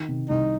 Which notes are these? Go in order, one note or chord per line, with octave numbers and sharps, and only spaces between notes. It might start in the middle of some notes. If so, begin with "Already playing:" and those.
Already playing: D#3
C3
C2 D#4